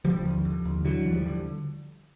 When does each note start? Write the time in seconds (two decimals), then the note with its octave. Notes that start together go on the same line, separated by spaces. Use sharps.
0.05 D3 F3 G3
0.25 D#2
0.45 D3
0.65 D#2
0.85 D3 E3 F#3
1.05 D#2
1.12 F3 G3
1.25 D3